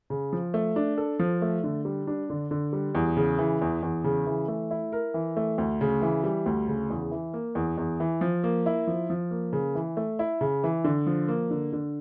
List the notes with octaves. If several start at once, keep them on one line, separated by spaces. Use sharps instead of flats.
C#3
F3
A3
D4
A4
F3
A3
D3
G3
D4
D3
D3
G3
E2
C#3
E3
E2
E2
C#3
E3
A3
E4
A#4
E3
A3
D2
C#3
E3
G3
D2
C#3
E2
E3
A#3
E2
E2
E3
F3
A#3
E4
F3
F3
A#3
C#3
E3
A3
E4
C#3
E3
D3
F3
A#3
D3
D3